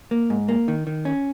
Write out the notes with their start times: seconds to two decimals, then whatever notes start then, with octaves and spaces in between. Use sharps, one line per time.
0.11 A#3
0.30 G#2
0.48 A#3
0.68 D#3
0.87 D#3
1.05 C#4